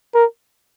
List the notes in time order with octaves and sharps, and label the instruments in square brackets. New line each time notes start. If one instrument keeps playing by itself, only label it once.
[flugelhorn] A#4